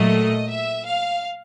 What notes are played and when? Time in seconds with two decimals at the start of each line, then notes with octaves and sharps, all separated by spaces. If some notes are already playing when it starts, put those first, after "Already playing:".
Already playing: A#2 F#3 A3 D#5
0.48 E5
0.85 F5